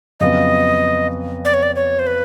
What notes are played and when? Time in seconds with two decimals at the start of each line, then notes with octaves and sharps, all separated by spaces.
0.20 F2 C#3 F#3 B3 D#5
1.45 D5
1.54 C#5
1.63 D5
1.76 C#5
1.99 C5
2.07 B4